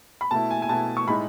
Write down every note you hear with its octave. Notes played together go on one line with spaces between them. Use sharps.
B5
B2 A3 E4 A5
G#5
G#5
B2 A3 E4 A5
C#6
A2 G#3 D#4 B5